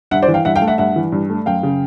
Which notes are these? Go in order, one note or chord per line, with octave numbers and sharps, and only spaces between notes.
G2 E5 F#5
C5 D5
E3
F5 G5
G2 E5 F#5
F5 G5
A3
E5 F#5
G2 E5 F#5
E3
G2
A3
F#2 F5 G5
C#3